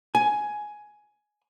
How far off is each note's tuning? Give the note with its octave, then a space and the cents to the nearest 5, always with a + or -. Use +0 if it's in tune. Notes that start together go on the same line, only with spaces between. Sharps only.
G#5 +10